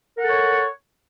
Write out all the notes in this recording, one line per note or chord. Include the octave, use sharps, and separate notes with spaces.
A4 A#4 C#5 F#5